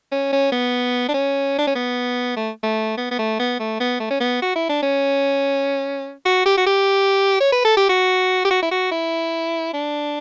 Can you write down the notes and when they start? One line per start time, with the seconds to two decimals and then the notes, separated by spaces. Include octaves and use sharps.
0.12 C#4
0.33 C#4
0.52 B3
1.09 D4
1.14 C#4
1.59 D4
1.68 C#4
1.75 B3
2.37 A3
2.64 A3
2.98 B3
3.11 B3
3.19 A3
3.40 B3
3.60 A3
3.80 B3
4.00 A3
4.11 C#4
4.20 B3
4.42 F#4
4.56 E4
4.69 D4
4.83 C#4
6.26 F#4
6.46 G4
6.58 F#4
6.66 G4
7.41 C#5
7.53 B4
7.65 A4
7.77 G4
7.89 F#4
8.45 G4
8.51 F#4
8.63 E4
8.71 F#4
8.92 E4
9.74 D4